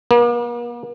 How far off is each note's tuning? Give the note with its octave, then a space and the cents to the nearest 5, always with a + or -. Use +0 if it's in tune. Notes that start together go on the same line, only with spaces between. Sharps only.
A#3 +45